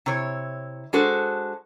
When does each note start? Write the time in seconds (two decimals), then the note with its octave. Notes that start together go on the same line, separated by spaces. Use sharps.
0.06 C3 E4 C#5
0.93 G#3 D4 F#4 A4 C5